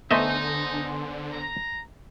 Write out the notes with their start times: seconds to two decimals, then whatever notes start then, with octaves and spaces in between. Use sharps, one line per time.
0.11 D3 A3 B3 D#4 C5 D#5 E5 G#5
1.32 A#5